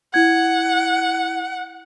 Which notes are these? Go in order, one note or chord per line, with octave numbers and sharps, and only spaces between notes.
E4 F#5 G#6